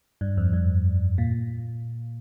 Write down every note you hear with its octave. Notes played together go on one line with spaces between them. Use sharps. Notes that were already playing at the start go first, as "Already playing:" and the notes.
G2
F2
G2
A#2